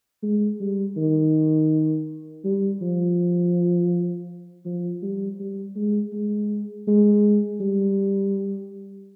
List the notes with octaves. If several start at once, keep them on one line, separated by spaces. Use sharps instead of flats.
G#3
G3
D#3
G3
F3
F3
G3
G3
G#3
G#3
G#3
G3